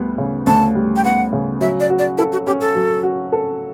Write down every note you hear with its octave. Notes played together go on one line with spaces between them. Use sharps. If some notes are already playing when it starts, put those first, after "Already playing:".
Already playing: D2 G3 B3
C#3
D2 A5
G3
G5
B3 F#5
C#3
F#3 E5
D5
F#4
D5
E4 A4
F#4
C#4 G4
A4
F#3
F#4
A4